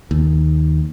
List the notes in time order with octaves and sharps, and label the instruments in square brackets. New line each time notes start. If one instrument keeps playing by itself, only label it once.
[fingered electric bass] D#2